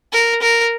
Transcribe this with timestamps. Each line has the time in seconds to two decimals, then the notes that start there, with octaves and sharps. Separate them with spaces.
0.13 A#4
0.42 A#4